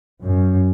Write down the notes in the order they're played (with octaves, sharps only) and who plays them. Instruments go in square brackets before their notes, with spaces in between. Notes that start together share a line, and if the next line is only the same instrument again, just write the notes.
[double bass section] F#2